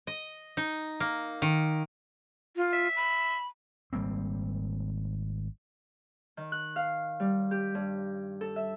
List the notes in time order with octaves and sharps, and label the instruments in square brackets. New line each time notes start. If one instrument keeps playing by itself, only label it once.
[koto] D#5
D#4
A#3
D#3
[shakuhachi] F4
[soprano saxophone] E5
[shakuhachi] B5
[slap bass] G#1 G3 A#3 C4
[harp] D#3
F#6
F5
G3
G4
G2
A4
E5